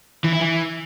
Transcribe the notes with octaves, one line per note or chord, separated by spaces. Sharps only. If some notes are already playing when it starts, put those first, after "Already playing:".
E3
E4
E3